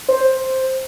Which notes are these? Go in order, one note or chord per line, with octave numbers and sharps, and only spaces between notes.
C5